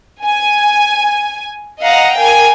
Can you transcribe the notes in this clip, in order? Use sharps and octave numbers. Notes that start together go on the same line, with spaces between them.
G#5
D#5 F5 F#5 A#5
A#4 F5 G5 G#5